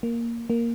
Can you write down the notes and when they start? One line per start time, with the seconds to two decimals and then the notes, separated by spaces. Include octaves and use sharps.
0.03 A#3
0.50 A#3